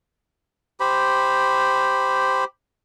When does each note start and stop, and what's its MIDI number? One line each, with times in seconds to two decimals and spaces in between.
0.80 2.44 67
0.80 2.44 72
0.80 2.44 83